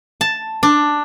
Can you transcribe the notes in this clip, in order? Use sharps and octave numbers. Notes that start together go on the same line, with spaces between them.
A5
D4